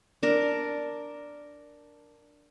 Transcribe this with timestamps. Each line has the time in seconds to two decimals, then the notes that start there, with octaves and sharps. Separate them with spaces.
0.23 D4 A#4